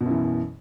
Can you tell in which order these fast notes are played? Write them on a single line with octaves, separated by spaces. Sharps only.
B2 F#2 E3